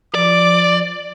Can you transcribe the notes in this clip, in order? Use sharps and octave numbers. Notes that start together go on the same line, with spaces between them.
F3 D5 D6